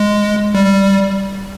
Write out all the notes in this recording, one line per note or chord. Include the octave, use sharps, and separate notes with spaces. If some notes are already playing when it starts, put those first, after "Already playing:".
Already playing: G#3
G3